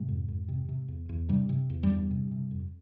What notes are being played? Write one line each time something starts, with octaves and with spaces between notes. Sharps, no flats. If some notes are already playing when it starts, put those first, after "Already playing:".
Already playing: G#2 C3 G#3
F2
F2
C3
C3
E2
E2
G2 C3 G3
C3
E2
G2 G3
E2
C3
C3
F2